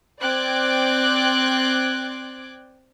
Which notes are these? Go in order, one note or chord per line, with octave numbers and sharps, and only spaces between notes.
C4 D5 G5 D6 F#6 G#6